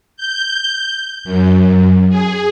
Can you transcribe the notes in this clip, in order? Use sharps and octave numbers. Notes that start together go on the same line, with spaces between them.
G6
F#2
G#4